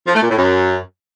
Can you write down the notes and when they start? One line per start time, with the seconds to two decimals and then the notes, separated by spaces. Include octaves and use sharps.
0.07 F3
0.15 A3
0.23 A#2
0.30 A2
0.38 F#2